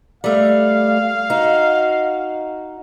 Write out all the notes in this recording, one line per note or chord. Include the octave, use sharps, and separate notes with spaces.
G3 A3 F5
D#4 F#4